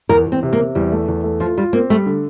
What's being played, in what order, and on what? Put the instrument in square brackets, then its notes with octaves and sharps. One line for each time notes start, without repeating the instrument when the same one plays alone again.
[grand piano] E2 [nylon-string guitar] A#4
[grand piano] E2
[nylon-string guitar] C4
[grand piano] C3
[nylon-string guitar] A#3
[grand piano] C3
[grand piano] E2 [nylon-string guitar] G3
[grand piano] A3
E2
A3
[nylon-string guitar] F3 [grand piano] F4
[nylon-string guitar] G3 [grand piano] F4
[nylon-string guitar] A#3 [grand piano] C4
[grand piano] G3 [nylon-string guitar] A3
[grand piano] D3